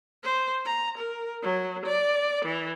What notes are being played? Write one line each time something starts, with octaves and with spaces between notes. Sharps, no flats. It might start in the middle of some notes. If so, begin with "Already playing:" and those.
C5
A#5
A#4
F#3
D5
E3